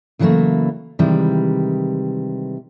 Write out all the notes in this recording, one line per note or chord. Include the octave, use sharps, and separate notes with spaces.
C#3 E3 F#3 G3 A3 A#3
C3 D#3 E3 G3 G#3